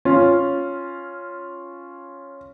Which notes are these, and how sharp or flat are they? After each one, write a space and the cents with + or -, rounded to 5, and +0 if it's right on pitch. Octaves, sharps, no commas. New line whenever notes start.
C#4 +0 F4 +0